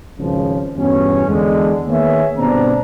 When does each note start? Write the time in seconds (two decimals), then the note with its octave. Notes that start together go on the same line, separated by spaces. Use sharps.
0.18 G#1 C#2 C#3 F3
0.76 E2 G2 B2 C#4
1.27 E2 D3 G#3
1.88 D#3 A#3 B3 G#4 C#5 E5
2.37 G1 B2 C4 D4 A#5